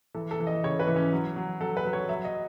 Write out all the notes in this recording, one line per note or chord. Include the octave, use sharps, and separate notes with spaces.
E3 A4
A4
E3
D#5
C#3 C#5
B4
E3
C#4
F#3
F#3
F#3 A4
B4
F#3
C#5
F#3 E5
D#5